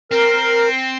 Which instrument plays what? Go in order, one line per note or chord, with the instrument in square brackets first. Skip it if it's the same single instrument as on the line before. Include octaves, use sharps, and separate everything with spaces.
[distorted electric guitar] C4 [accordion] A#4